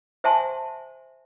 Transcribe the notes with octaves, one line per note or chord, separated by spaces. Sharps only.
C5 E5 F#5 G#5 A5 C6